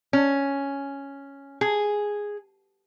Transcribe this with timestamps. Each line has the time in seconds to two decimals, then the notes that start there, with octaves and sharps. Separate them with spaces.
0.13 C#4
1.61 G#4